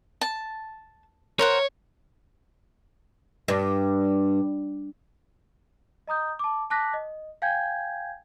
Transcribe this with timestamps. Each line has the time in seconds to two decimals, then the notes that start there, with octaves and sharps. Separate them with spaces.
0.21 A5
1.39 A#4 C5 C#5 F#5
3.48 G2
6.07 D#5 A#5 D#6 G6
6.39 A5 D6
6.70 A5 D6 F#6 A#6 B6
6.94 D#5
7.42 F5 G5 G#5 G6 G#6